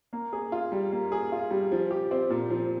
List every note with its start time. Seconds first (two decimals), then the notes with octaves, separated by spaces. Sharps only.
0.13 A#3
0.33 G#4
0.52 F4
0.72 G3
0.92 A#3
1.12 G#4
1.32 F4
1.51 G3
1.72 F3
1.91 G4
2.11 C4
2.30 A#2
2.50 F3